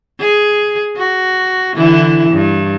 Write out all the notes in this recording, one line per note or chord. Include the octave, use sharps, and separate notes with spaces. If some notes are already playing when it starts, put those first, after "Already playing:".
G#4
F#4
D3 E3 E4
G2